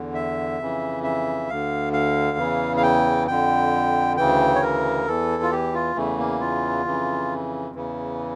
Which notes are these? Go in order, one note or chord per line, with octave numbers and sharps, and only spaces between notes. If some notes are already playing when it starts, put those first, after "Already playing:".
Already playing: E2 D3
E5
F2 C#3 E3
E5
D2 D3 F5
F5
E2 C#3 E3
F5
G5
F2 D3 G5
D2 C#3 E3 G5
C#5
A#4
E2 E3 A4
F4
G4
F4
E2 C#3 E3 A3
A#3
F4
F2 C#3 E3
E2 C#3 E3